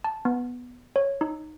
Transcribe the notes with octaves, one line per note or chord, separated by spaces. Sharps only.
A5
B3
C#5
D#4